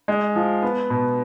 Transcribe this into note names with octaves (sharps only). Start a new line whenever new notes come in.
G#3
F3
B3
B2